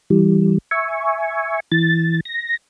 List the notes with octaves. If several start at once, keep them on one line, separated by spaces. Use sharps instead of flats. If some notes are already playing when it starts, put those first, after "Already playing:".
E3 G3
E5 G#5 C#6
E3 A6
A#6